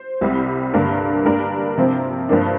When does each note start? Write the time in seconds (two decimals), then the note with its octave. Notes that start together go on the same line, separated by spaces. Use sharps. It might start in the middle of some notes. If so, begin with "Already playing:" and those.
Already playing: C5
0.21 C2 C3 G3 C4
0.74 G2 D3 G3 A#3 D4 A#4
1.26 G2 G3 A#3 D4 A#4
1.78 C3 F3 C4
2.29 G2 F3 A#3 D4